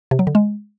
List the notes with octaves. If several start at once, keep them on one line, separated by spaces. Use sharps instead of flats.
C3
F#3
D3
G#3